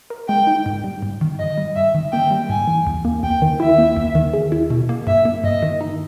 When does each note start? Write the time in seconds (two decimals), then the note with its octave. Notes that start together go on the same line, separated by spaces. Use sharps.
0.10 A#4
0.28 G#3 G5
0.47 D#4
0.66 G#2
0.84 G3
1.03 G#2
1.21 D#3
1.39 G2 D#5
1.58 G3
1.76 G2 E5
1.95 D#3
2.12 A#3 G5
2.31 G3
2.49 G#2 G#5
2.67 E3
2.87 D#2
3.05 A#3
3.23 D#2 G5
3.42 D#3
3.60 E4 E5
3.78 A#3
3.97 D#2
4.15 D#3
4.34 G#4
4.52 E4
4.70 B2
4.89 A#3
5.07 G2 E5
5.25 A#3
5.44 G2 D#5
5.63 D#3
5.81 D#4